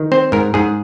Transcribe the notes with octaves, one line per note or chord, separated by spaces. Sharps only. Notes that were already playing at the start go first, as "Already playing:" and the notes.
Already playing: D#3
C4 C5
G#2 A#4
G#2 G#4